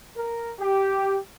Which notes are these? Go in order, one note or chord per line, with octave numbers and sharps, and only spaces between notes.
A#4
G4